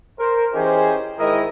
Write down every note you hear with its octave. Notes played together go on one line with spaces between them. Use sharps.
A#4 C5
E3 C#4 D#4 G4 G#4 C5
G#2 D#3 E4 A#4 D#5